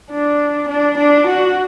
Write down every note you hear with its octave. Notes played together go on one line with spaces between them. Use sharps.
D4
D4
D4
F#4